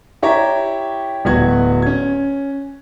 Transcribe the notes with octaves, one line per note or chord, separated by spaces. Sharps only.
E4 G4 C#5 E5 A#5
D1 B3 F#4 G#6
C#4 G#6